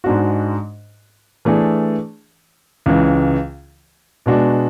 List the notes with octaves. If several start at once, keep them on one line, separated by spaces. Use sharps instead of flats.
G#2 G#3 D4 F#4
E3 A3 D4 G#4
C#2 C#3 E3
B2 G#3 D4 F#4